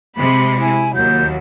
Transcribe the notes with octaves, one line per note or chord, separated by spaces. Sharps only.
C3 G#3 B5
E4 G#5
D#2 F#3 G6